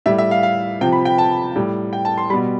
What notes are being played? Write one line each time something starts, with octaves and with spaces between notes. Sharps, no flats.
A2 G3 E5
E5
F5
F5
C3 F3 G5
B5
G5
A5
A2 G3
G5
A5
C6
B2 G3 B5